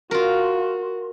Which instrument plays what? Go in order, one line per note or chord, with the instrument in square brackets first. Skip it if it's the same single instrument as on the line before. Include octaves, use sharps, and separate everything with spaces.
[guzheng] F4 A#4 [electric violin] F#4